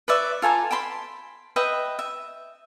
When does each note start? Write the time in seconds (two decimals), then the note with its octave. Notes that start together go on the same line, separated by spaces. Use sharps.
0.08 B4 C#5 D5 E5
0.42 F4 A4 G#5 A#5
0.71 G5 A5 B5 C6
1.56 B4 D#5 E5 G5
1.99 E5